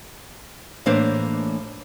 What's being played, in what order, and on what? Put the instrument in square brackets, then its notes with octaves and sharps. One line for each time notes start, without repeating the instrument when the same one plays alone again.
[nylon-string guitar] A2 E3 A#3 D4 C5 F5